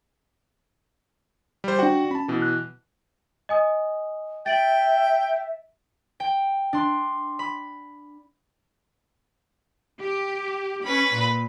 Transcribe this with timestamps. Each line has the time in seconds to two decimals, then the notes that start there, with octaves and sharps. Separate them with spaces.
1.64 G3 C5
1.79 D4 F#4 F#5 G5
2.11 C#4 A5 B5
2.28 B2 E3
2.42 F#6
3.49 D#5 G#5 D#6
4.46 E5 G5 A6 D7 F#7
6.20 G5
6.73 D4 C6
7.39 B5
10.01 G4
10.85 C#4 B4 B5
11.13 A#2